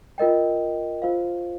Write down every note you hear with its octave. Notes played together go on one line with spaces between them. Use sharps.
F4 A#4 D#5 G5
F4 C5 F5